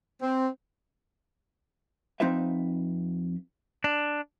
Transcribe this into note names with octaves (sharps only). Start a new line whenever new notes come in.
C4
F2 C4 D#4 F4 B4 E5
D4